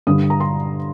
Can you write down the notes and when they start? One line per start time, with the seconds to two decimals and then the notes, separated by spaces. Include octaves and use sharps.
0.07 G2 D3 D#6
0.30 A#5
0.40 C6